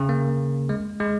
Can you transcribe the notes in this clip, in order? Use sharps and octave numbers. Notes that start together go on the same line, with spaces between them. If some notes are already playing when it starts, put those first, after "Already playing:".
Already playing: C#3
A#3
G#3
G#3